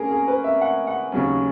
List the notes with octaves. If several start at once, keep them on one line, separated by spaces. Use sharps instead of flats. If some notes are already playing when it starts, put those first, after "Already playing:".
Already playing: A#3 C#4 G#4 A#4
G#4
B4
E5
F#5
F#5
D#2 C#3 F#3 C#4